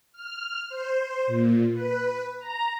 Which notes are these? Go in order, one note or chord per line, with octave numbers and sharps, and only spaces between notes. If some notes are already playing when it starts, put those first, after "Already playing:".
F6
C5
A#2
B4
A#5